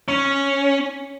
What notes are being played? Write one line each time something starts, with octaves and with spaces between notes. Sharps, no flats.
C#4